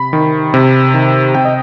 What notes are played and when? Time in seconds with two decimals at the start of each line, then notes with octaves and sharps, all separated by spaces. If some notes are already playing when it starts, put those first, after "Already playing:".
Already playing: C3 B5
0.13 D#3
0.54 C3
0.94 D#3
1.34 C3 G5
1.45 D#5